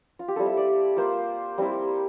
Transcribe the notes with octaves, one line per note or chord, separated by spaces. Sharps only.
F4
G4
G3 C4 E4 A4
E5
D5
A#3 F4 C5
G3 C4 E4